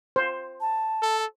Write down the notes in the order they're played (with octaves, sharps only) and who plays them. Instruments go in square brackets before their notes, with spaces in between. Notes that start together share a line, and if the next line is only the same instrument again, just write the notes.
[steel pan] C5
[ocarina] A5
[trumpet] A4